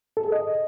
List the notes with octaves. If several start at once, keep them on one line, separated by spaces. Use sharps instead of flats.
A4
G#4
D#5